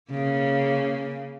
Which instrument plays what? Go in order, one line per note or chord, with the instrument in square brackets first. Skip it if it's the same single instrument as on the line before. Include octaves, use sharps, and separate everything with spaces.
[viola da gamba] C#3 A#3